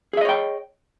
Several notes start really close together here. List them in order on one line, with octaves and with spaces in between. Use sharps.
G#4 E5 D#5 C#5 G5